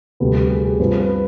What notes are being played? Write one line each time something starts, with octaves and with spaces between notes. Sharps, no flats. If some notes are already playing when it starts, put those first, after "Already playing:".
D2 C3 G3 B4
G4
G#4
G#4
G2 F3 C4 B4
B4